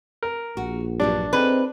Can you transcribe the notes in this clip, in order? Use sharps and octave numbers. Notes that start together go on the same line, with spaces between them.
A#4
A#1 F#4
G2 F#3 G3 D4
C4 D#4 G#4 B4